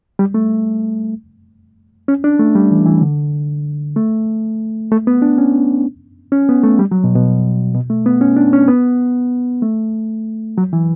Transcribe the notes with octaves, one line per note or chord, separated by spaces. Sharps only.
G3
A3
C#4
D4
A3
G3
E3
E3
D3
A3
A3
B3
D4
C#4
C#4
B3
A3
G3
F#3
B2
B2
B2
A3
B3
C#4
D4
C#4
B3
A3
F#3
E3